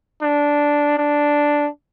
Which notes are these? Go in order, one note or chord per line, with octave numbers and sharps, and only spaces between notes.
D4
D4